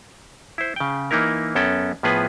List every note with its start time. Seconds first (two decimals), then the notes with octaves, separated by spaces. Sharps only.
0.58 E4 C5
0.76 C#3 G5
1.11 E3 A#3 D#4 E4 A#4
1.55 F#2 B3 C#4 A4 G5
2.03 A2 F3 B3 G#4 B4